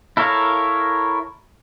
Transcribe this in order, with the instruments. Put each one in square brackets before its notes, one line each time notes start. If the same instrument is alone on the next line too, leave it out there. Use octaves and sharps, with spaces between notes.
[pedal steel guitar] E4 A4 A#4 C#5 F5